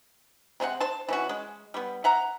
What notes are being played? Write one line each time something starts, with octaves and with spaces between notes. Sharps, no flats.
C3 G#3 F4 F#5
C5 A5
E3 C#4 F#4
G#3
G3 B3
E5 F#5 A#5